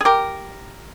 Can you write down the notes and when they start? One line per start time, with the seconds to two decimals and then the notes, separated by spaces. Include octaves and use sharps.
0.01 G#4
0.05 G4 A#4